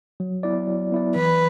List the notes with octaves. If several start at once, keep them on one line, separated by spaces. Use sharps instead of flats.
F#3
B3 E4 D5
F#3
B3 E4 D5
E3 B4